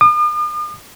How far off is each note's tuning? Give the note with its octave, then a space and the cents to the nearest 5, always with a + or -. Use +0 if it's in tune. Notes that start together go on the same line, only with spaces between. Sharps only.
D#6 -45